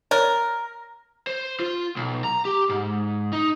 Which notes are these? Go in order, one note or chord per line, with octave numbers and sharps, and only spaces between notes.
A#4 C#5 D5 F#6
C5
F4
B1
A#5
G4
G#2
D#4